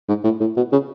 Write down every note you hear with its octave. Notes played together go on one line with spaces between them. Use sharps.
G#2
A2
A2
B2
C#3